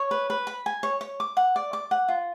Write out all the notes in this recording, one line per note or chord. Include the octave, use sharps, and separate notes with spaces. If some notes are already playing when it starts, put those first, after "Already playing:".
Already playing: C#5
B4
B4
B5
G#5
C#5
C#5
D6
F#5
D5
D6
F#5
F4